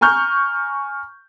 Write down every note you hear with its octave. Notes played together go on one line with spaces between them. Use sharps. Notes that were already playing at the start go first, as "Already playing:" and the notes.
G#5 A#5 C#6 F6 G6